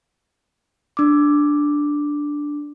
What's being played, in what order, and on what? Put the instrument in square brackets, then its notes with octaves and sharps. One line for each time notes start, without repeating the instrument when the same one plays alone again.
[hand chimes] D4 D6